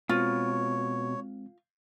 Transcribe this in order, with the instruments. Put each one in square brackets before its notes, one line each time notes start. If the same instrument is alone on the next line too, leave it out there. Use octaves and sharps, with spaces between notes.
[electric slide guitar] B2 [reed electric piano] G#3 C4 [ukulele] F4 [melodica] C#5